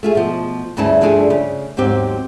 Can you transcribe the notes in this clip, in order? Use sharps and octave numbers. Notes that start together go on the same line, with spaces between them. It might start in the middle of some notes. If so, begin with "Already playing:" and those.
A3 F4 G#4
B2 F3
D2 G2 C#3 C#4 E4 A5
G2 F3 A3 D4 G#4 A5
C#3
D#2 G#2 F#3 C4 G4